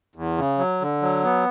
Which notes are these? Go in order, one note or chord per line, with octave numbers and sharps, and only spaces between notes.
E2
C#3
F#3
D3
F#3
B3